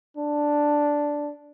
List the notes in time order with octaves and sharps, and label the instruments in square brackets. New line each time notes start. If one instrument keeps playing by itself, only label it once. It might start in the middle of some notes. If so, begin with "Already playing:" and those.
[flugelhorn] D4